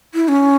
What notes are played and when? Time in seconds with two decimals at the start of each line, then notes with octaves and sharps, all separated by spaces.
0.14 E4
0.28 C#4